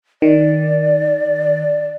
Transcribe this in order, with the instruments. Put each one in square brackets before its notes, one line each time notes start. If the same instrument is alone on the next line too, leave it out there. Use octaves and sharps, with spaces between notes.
[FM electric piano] D#3 [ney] D5